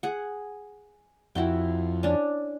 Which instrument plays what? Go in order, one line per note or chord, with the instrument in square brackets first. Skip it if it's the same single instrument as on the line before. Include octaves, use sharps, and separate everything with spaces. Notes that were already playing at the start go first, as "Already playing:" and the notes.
[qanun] G#4 F#5
[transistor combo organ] F2 [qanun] E4 F#4 G5
[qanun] C#4 D4